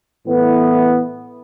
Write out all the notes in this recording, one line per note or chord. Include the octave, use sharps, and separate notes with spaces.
A2 E3 B3